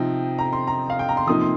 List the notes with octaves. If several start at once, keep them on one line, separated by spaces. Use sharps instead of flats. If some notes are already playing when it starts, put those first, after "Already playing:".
Already playing: C3 F3 C4 D#4 G5
A#5
C6
A#5
F5
G5
A#5
C6
C3 F3 A#3 D#4 D#6
C6